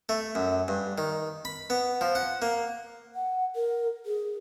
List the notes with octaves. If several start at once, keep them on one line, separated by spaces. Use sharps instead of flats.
A3
F#2
G2
D#3
B5
B3
F3
F#5
A#3
F#5
A#4
G#4